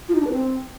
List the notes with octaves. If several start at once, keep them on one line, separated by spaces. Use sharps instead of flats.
F4
D#4
D4
B4
C4